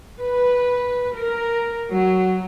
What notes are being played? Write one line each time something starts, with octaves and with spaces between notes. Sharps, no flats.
B4
A#4
F#3